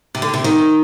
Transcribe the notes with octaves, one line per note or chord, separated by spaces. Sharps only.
C3
D3
C3
D#3